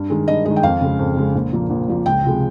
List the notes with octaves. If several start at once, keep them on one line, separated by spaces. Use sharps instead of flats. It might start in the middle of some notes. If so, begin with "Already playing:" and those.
Already playing: G2
D#3 G#3
G2 D#5
D#3 G#3 D#5
G5
F2 F5
C#3 G#3
F2
C#3 G#3
A#1
A#2 F3 A#3
A#1
A#2 F3 A#3
C#2 G5
C3 F3 G#3